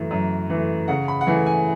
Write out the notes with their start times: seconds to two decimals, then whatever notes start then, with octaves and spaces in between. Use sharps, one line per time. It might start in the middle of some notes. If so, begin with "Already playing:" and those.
Already playing: F#2 E3 A3
0.11 F#2
0.50 E3 A3
0.88 C#3 F#5
1.08 B5
1.21 F#5
1.27 E3 A3 E4 G#5
1.46 G#5